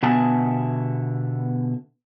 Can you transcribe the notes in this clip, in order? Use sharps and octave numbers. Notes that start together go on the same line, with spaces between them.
B2 D3 B3 E5 G#5 A5